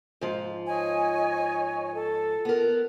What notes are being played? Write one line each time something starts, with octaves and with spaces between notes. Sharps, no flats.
G#2 F3
C#5 D#5 G#5
A4
B3 A#4